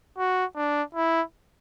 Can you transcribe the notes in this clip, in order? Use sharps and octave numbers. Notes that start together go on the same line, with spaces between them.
F#4
D4
E4